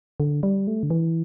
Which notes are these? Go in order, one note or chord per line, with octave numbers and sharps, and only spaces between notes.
D3
G3
A3
D3
E3